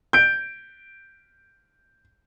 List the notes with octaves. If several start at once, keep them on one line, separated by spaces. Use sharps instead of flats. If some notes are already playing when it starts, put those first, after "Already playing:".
G6 D7